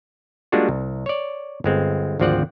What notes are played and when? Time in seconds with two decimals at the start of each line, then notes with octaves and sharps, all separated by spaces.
0.52 G3 G#3 A#3 D4 F4 F#4
0.69 C2
1.06 C#5 D5
1.64 G1 G#3 C4
2.20 G#1 D2 F3 C4 D5 F#5